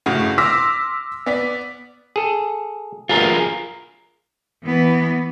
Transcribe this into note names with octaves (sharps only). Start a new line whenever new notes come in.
G1 A2 C#3 F#4 G#4
C6 D6 E6 F6 A#6 B6
B3 D5 B6
G#4 A4
G1 D2 F4 G#4 A#4
E3 B3